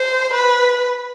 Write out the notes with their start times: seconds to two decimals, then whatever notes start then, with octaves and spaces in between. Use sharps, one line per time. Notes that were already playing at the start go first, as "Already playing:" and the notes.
Already playing: C5
0.33 B4